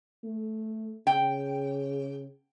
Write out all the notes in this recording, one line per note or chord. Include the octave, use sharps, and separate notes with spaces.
A3
C#3 G5